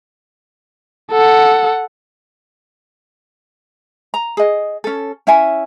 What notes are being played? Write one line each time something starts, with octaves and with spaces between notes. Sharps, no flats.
A4 F#5
A#5
G#4 D#5
C#4 A4
C#4 E4 E5 G#5